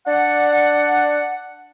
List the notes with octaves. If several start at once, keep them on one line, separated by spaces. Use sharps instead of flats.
D4 D5 F#5